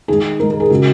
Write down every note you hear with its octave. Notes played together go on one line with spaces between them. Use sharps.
D#3 G#3 G#4
D#3 G#3 A#4
A#4
G#4
C#3 G#3 F#4